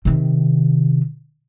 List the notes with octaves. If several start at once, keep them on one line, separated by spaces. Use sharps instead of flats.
C3 D#3